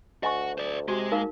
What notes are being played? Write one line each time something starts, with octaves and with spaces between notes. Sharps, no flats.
D2 F#4 D#5 F#5 G#5 C#6
C5 D5
C3 G#3 F#4
A#3 D#4 A#4 F5